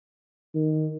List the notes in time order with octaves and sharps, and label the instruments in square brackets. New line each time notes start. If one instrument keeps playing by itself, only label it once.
[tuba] D#3